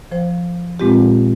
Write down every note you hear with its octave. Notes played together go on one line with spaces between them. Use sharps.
F3 C5
A#2 G#3 C4 F4 G4